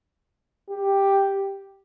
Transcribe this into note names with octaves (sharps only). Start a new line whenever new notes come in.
G4